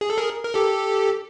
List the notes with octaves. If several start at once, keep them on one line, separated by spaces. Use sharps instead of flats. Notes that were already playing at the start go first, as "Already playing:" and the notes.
G#4
A4
G#4 A#4
A#4
G4 A4